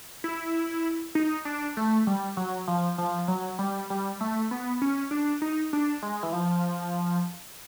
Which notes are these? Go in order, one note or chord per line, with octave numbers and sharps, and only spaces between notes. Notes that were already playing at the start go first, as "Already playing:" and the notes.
E4
D#4
D4
A3
G3
F#3
F3
F3
F#3
G3
G3
A3
B3
C#4
D4
D#4
D4
G#3
E3
F3